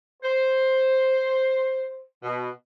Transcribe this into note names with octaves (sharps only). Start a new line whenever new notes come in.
C5
B2